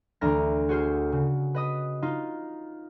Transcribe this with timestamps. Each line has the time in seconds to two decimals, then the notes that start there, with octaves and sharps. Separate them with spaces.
0.21 D2 E3 D4 A#5 F6 A#6
0.69 F#4 G#4 C5 F6
1.12 C#3
1.54 B4 D#5 D#6
2.02 D#4 F4